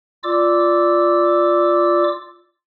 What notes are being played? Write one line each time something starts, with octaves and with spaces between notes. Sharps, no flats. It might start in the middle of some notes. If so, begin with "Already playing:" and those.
F4 D5 D6 E6